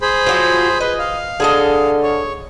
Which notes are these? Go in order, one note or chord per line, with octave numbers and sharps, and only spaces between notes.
G#4 C5 B5
F3 F#3 F4
B4 D#5
F5
D3 G#4 A4 D#5
C#5